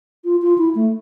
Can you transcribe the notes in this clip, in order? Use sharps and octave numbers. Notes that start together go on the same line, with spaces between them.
F4
F4
E4
A3